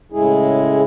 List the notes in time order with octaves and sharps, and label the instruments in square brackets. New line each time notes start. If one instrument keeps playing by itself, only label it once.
[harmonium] A2 C#3 G#3 E4 G#4